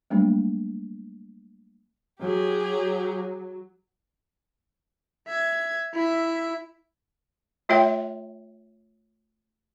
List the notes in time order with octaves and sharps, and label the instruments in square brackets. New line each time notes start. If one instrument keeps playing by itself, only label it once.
[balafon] F#3 G3 A3 A#3 C#4 D4
[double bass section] F#3 [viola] G4 G#4
[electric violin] E5 G#6
E4 E5
[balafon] A3 F4 C#5 E5 G5